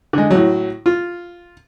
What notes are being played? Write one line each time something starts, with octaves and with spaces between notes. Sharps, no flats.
D3 G#3
A2 F#3
F4